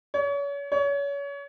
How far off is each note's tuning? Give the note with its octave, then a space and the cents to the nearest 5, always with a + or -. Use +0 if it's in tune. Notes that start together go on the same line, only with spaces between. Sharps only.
C#5 +35
C#5 +30